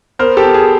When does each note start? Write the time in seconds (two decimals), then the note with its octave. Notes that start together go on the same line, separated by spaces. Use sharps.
0.19 B3 A#4 C5
0.37 G4 A4
0.43 B3
0.54 G#4